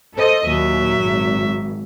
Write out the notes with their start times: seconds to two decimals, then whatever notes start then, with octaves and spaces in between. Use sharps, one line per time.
0.16 A4 C5 D#5
0.46 D#2 A#2 F#3 E5
1.01 G#1